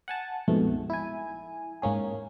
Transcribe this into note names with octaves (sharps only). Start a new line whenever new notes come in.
F#5 G#5 A5
A#1 F2 G#2 B2 A3
E4 G#5
G#2 A#3 C#4 G#4